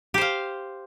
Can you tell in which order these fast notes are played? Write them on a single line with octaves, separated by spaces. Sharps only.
G4 C5 F5